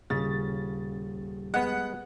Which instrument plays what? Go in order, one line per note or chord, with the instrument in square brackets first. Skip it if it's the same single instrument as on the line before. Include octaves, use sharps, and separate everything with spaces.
[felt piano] D#1 [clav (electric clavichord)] C#3 [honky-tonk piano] A6
[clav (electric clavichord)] G#3 B3 [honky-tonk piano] F#5